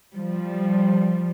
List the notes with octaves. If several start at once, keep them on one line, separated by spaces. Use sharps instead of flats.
F3 G3